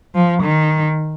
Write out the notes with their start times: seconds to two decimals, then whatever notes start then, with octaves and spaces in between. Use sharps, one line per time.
0.14 F3
0.43 D#3